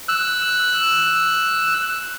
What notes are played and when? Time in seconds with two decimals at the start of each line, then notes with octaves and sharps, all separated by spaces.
0.09 E6 F#6